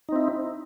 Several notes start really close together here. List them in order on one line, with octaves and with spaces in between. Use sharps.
D#4 C4 E4